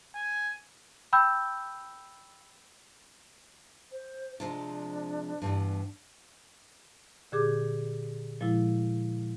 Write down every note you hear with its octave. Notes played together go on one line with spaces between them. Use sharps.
G#5
G5 B5 E6 G6
C5
C3 F3 G#3 D4
G2 B2 E3
A#2 D3 G4 G#4 D6
A#2 F3 G#3 E4